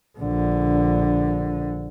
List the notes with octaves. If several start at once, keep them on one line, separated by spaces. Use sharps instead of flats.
A#1 D3